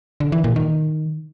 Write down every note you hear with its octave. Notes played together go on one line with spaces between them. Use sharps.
D3
E3
A#2
D#3